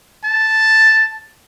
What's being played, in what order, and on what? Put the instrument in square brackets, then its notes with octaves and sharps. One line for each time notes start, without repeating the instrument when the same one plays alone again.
[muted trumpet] A5